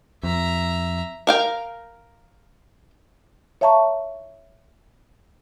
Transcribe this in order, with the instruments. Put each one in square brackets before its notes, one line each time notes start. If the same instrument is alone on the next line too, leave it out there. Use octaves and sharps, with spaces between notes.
[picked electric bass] F2 [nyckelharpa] E5 A#5
[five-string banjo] A#4 F5 G5
[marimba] C#5 E5 F5 A5 A#5 C#6